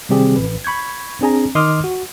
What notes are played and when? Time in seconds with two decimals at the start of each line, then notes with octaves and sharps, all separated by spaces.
0.09 C3 D#3 G3 C4 G4 G#4
0.36 A1 B4
0.64 B5 C#6 G6 G#6
1.21 C4 D4 G#4 G#5 A#5
1.55 D#3 D#5 C6 D6 D#6 F6
1.84 F#4